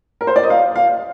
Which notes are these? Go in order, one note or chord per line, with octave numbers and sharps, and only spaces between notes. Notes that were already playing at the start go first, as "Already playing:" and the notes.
A#4
C5
D5
D#5
F5
F5